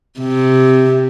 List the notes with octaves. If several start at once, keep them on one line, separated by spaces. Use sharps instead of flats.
C3